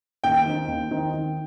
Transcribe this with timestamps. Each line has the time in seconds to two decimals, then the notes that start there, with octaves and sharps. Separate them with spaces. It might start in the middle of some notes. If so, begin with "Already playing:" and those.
0.24 D#2 G5
0.46 D#3 C4 D#4
0.68 D#2
0.91 D#3 C4 D#4
1.14 D#3